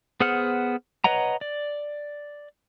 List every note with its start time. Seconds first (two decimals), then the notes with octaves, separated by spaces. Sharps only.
0.20 B3 G#4 C5 F#5 F6
1.04 B4 C#5 D#5 F#5 A#5
1.41 D5